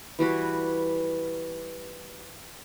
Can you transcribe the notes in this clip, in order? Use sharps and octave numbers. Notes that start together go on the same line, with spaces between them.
E3 G3 F#4 B4